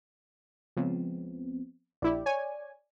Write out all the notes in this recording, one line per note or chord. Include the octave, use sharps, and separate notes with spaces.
C#2 F3 B3 C4
A#1 E4 G4 D5
C#5 G#5